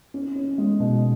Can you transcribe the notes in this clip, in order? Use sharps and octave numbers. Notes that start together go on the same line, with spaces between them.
C#4
C#4
G#3
B2